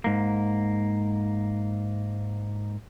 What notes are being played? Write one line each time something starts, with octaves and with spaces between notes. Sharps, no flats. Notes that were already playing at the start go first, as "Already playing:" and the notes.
G#2 A#3